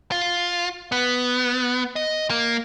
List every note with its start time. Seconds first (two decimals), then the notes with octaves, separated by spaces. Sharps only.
0.12 F4
0.92 B3
1.96 D#5
2.30 A#3